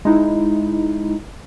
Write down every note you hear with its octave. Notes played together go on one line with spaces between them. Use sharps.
G#3 D#4 E4